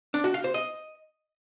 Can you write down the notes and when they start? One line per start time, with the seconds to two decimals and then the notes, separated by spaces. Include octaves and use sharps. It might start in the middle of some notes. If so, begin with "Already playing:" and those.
0.14 D4
0.24 F#4
0.34 F5
0.44 C5
0.54 D#5